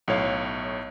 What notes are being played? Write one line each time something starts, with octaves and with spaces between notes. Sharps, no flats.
B1 A2 C#5 F5